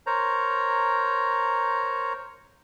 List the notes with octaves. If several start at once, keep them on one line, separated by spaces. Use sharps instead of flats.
A#4 C5 C#5 A#5